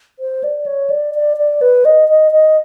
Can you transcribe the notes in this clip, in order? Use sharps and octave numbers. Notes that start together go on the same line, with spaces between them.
C5
D5
C#5
D5
D5
D5
B4
D#5
D#5
D#5